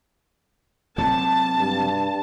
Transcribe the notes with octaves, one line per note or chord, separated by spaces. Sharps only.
C3 F#3 A5
G2